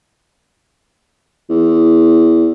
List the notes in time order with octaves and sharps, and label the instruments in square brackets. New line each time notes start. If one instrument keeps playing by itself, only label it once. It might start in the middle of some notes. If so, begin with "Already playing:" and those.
[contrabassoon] E2